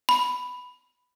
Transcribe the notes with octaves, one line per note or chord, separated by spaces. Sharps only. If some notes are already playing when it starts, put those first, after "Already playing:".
B5